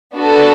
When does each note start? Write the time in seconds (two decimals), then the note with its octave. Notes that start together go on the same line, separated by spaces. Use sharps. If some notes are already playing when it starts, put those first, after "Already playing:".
0.15 B3 D4 F#4 A4